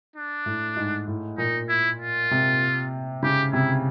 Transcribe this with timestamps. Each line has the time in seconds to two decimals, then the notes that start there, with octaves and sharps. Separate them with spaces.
0.16 D4
0.46 A2
0.76 G#2
1.08 A2
1.38 A#2 D#4
1.69 E4
2.00 F4
2.31 C3
3.22 C#3 G4
3.53 C3 E4